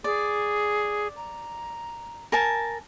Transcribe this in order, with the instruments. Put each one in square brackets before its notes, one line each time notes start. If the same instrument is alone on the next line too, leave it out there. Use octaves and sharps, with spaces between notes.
[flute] G#4 [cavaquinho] D5
[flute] A#5
[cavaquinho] A#4 G#5 A5